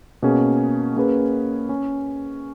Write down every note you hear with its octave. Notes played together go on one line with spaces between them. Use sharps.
B2 A#3 C#4 G#4
A#3 C#4 G#4 B4
C#4